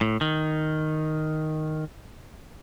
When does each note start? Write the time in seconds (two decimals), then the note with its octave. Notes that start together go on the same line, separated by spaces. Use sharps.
0.01 A2
0.21 D#3